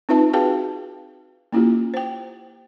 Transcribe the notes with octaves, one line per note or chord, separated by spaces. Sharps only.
C4 D#4 F4 B4 E5 A5
F#4 G#4 B4 F5 G5 A5
A#3 C#4 E4 F4 G4
C5 G5